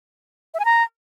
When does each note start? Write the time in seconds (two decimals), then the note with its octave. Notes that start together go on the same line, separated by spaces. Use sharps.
0.54 E5
0.60 G#5
0.65 A#5